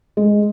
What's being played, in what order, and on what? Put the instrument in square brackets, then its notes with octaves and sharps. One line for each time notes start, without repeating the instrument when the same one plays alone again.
[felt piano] G#3